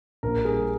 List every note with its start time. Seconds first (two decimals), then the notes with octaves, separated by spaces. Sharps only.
0.23 A#1 A#4
0.45 G3 G#4